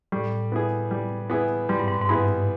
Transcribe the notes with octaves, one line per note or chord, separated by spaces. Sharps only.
A2 G3
B3 E4 G#4
G3
B3 E4 G#4
G#2 G3
G2
G#2
G#2
G2 B3 E4 G#4